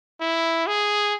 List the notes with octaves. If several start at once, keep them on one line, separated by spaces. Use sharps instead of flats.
E4
G#4